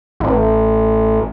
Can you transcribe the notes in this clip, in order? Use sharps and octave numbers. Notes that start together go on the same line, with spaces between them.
A1